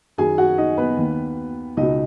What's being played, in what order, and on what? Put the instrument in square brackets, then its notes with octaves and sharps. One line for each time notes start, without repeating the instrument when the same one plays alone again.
[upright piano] F#2 D#3 G#4 G#5
F#4 F#5
D#4 D#5
B3 B4
D#2 D#3
C#2 B2 D#4 D#5